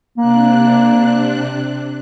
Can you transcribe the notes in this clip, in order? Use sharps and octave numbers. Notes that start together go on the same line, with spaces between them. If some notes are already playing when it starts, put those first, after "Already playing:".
C3 A#3 D4 F#6